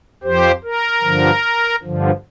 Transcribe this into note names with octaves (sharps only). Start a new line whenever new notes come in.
F2 F3 G4 C5
A#4
G2 D3 F3
G2 D3 F3